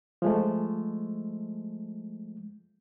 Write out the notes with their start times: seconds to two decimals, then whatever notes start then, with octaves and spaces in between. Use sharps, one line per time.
0.22 F3 G#3 A3